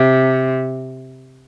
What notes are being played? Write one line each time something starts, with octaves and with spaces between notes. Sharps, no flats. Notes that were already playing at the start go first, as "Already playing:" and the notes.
Already playing: C3